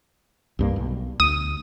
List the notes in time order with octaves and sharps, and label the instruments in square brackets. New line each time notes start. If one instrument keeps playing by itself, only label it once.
[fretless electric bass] C2 G2 A#3
B1
[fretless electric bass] D2 [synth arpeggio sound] D#6